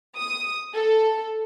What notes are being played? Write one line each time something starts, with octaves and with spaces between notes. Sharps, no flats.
D#6
A4